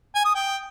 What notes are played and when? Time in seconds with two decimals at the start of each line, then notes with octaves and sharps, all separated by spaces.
0.15 G#5
0.25 D#6
0.35 G5